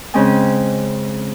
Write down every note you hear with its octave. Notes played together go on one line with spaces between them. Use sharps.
C#3 G#3 C4 C#4 D#5 G#5